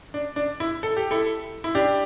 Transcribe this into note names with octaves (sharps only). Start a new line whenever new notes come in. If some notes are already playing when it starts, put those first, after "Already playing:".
D4
D4
E4
A4
G4
E4 A4
E4
D4 G4